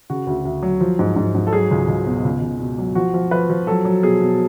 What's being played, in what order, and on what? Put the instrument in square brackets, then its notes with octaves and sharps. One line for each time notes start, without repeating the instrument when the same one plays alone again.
[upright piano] C#3 F#4
D2
D2
F#3
F3
G#2
G#2
G#2
A4
F#3 G#4
C#2
C#2
B2
C#2
C#2
B2
F#3
F3 F#4
F3
F3 B4
F3
F#3 A4
F#3
B2 G#4
B2